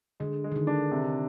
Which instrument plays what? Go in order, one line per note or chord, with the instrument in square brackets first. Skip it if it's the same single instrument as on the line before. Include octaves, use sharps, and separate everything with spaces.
[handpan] D3 [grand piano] G#3
[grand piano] G#3
[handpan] D#3
D3
[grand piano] D4
C3